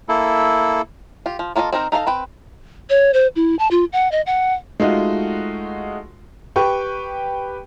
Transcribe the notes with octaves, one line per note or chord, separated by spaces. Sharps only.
A#3 E4 A4
F4 G4
F3
A#3 F4 A4 D5 D#5
C4 D#4 A#4 C5
D#4 A4 A#4 F5 A#5
C4 B4 G5
C#5
C5
E4
A5
F4
F#5
D#5
F#5
G#3 A3 D#4 F4 F#4
G4 B4 G5 C#6